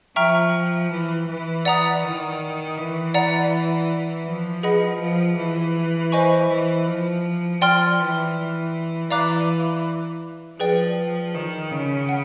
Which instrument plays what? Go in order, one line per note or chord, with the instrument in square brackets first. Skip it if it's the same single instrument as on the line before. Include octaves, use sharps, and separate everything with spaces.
[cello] F3 [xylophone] E5 G5 A#5 C#6 F6
[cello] E3
E3
[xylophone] D5 F#5 A#5 D#6
[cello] D#3
E3
[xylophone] D5 F#5 A#5
[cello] F3
[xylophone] G#4 B4 D#5 F#5 B5
[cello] F3
E3
[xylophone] C5 D#5 G#5 C#6
[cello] E3
F3
[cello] F3 [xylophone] D5 G5 C6 F6
[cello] E3
[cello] E3 [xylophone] D5 F5 A#5 D6 F#6
[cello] F3 [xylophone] G#4 B4 D5 G5
[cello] D#3
C#3
[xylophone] F#5